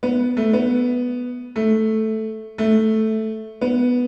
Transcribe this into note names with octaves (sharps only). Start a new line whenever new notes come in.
B3
A3
B3
A3
A3
B3